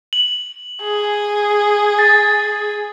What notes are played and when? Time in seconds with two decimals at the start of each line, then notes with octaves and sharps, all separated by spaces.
0.13 F#7
0.82 G#4
1.99 A6